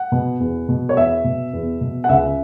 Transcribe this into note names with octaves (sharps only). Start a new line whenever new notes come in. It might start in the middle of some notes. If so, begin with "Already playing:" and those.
Already playing: F#5
B2
E2
B2
C#5
E2 E5
B2
E2
B2
F#5
C#2 E5